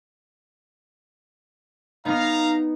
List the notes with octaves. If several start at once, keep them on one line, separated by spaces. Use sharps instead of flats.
B3 D#4 F5 A#5